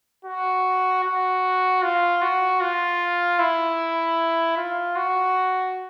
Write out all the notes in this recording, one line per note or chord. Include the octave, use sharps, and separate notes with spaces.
F#4
F#4
F4
F#4
F4
E4
F4
F#4